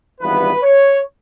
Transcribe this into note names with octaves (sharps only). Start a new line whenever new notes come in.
G#1 G2 E3 G3 B3 B4
C#5